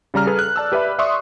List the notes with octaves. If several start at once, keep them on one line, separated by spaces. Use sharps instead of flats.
C#3 G3 A#5 F6
G#4 A4 B4
F#6
D5 A5 E6
G4 B4 D5 E5 B5
D5 E5 C6 C#6 D#6